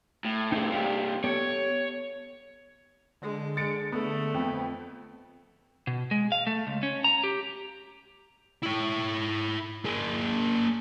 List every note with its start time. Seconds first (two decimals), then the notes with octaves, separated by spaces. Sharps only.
0.25 A2
0.52 A2 C3 D#4 G#4
0.71 G2 C3 G4 F5
1.24 B3 G4 A4 C#5
3.22 D3 G#3
3.57 G#3 A6 C#7 D7
3.92 A3 B3
4.34 F2 B3
5.87 B2
6.11 G#3
6.32 F5
6.47 A3
6.67 C#2
6.83 C#4
7.04 A#5
7.24 G4
8.63 E4 C#5
9.85 A#3 G#4